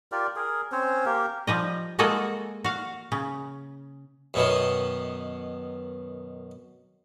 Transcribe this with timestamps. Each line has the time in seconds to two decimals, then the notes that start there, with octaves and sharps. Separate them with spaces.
0.12 F4 G4 A#4 D5
0.36 G#4 A#4
0.72 C4 C#4 C5 C#5
1.06 A#3 G4 A#4
1.47 F3 G3 D#5
1.99 G#3 A#3 F#4 G#4 A4
2.64 F#4 F5
3.12 C#3
4.34 F#2 B2 D#3